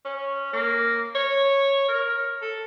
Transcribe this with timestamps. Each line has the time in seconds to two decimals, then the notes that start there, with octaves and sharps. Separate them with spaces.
0.05 C#4
0.53 A#3
1.15 C#5
1.88 A#4
2.42 A4